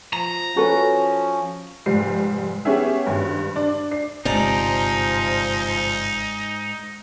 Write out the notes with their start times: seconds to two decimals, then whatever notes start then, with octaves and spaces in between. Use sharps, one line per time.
0.13 F3 A#5
0.56 F3 C#4 F#4 A4 B4
1.86 F1 G#2 G3 C7
2.65 B3 C#4 G4 G#4 E5
3.07 G#1 G2
3.56 D4
3.91 D4 C7
4.25 G1 G#2 C3 F3 D#4 D5 A#5